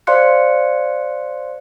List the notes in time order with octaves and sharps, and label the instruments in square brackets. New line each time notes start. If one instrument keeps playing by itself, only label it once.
[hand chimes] C5 D5 F5 C6 F#6 C#7